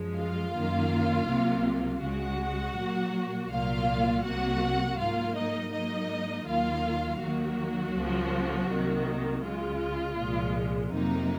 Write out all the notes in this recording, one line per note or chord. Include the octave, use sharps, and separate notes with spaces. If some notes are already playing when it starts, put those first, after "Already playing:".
Already playing: F#2 F3 G#3
F4 F5
F#2 D#3 A#3
C2 C3 F#3 A#3
C#2 C#3 G#3 F#4 F#5
A#2 F#3 A#3
C2 A#2 F#3 A#3 F4 F5
C2 C3 F#3 A#3 F#4 F#5
G#2 F#3 A#3 F4 F5
D#4 D#5
G#2 F#3 A#3 D#4 D#5
D#2 D#3 F#3 A#3 F4 F5
D#2 D#3 F#3 A#3 F#4
C#2 C#3 F3 A#3
C2 C3 D#3 A#3
C#2 C#3 G#3 F4
C2 A#2 F3 G#3
F2 C3 F#3 A#3 D#4